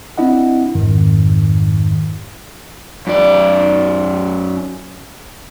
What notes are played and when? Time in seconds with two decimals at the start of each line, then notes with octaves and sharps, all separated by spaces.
0.18 C4 D4 E4 D#5 F#5
0.75 G#1 F2 G#2 D#3
3.07 F#2 D5